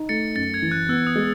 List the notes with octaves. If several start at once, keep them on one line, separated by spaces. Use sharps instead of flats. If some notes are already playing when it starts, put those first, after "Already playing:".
Already playing: D#4
A3 A6 C#7
F#2 A6
G#6
E3
F#6
B3 E6
D#6
G#3